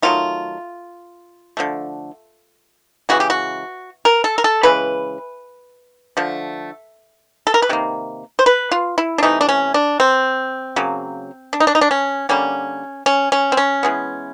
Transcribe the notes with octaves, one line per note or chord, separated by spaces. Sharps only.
D#3 F#3 A3 F4
D3 F3 A3
C#3 E3 G#3 F#4
G4
F#4
A#4
A4
A#4
A4
C#3 E3 G#3 B4
D3 F3 A3
A4
A#4
B4
C3 D#3 A#3
C5
B4
F4
E4
D4
C3 E3 A3 D#4
D4
C#4
D4
C4
C#3 F#3 A#3
D4
D#4
D4
D#4
D4
C#4
D3 G3 A#3 C#4
C#4
C#4
C4
C#4
E3 G#3 B3